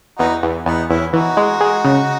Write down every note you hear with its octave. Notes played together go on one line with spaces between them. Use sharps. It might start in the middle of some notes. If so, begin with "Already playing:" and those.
E2 D#4 F#4
E2
E2 B3 D#4
E2 C#4 E4
E3 D#4 F#4
G#3
G#3
C#3